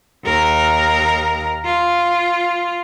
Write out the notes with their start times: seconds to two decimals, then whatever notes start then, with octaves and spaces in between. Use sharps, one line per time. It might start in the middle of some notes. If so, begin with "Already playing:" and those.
0.24 D#2 A#4
1.65 F4